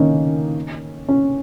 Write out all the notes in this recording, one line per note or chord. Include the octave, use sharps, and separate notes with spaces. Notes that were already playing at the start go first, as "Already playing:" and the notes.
Already playing: D#3 A#3 C#4 D#4
C#4